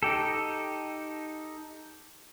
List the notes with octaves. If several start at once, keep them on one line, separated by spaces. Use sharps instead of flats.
D#4 G4 A4